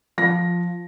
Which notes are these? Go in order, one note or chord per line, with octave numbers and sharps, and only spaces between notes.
F3 A#6